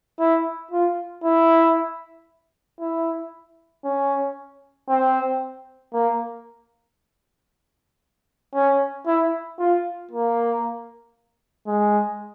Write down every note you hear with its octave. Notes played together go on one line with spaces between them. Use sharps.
E4
F4
E4
E4
C#4
C4
A#3
C#4
E4
F4
A#3
G#3